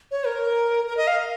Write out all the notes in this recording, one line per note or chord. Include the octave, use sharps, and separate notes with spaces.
C#5
A#4
A#4
D#5
F5